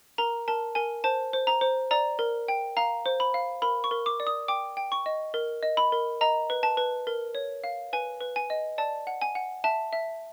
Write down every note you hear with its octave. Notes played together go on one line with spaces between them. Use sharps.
A#4 A#5
A#4 A5
A#4 G#5
C5 A5
C5
A#5
C5
D5 A#5
A#4
G5
F5 A#5
C5
B5
F5
A#4 B5
C#6
A#4
D6
D5
D#6
G5 D6
G5
C#6
D#5
A#4
D#5
B5
A#4
D#5 A#5
B4
A5
B4
A#4
C#5
F5
B4 G#5
B4
G#5
D#5
D5 A5
F#5
G#5
F#5
E5 A5
E5